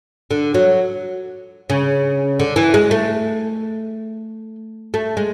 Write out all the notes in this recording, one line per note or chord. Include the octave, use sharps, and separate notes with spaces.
D3
F#3
C#3
D3
E3
G#3
A3
A3
G#3